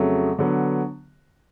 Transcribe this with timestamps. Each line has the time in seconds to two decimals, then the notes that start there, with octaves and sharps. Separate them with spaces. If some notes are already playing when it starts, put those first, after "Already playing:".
Already playing: F2 C#3 F#3 A3
0.39 D3 F#3 B3